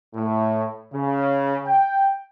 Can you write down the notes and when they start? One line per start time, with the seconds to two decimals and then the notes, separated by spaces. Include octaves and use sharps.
0.14 A2
0.93 C#3
1.66 G5